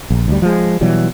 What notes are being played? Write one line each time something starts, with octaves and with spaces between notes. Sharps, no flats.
A#1
D2 G3
F3 G#3
B2 E3 F#3 G3